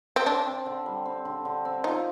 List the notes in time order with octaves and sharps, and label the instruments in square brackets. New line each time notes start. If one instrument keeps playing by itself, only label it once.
[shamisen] C4
[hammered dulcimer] C4 [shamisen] D4
[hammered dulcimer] C4
D3
G3
C4
D3
D3
C4
[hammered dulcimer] F3 [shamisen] D#4